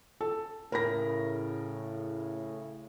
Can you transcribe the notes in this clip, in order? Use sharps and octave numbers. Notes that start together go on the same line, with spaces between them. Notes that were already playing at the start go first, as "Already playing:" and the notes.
A4
A2 C#3 A#4 B5 A#6